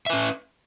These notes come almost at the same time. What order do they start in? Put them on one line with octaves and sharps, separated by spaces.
E5 B4 C#4